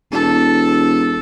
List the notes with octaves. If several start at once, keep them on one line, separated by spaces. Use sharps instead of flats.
E1 A4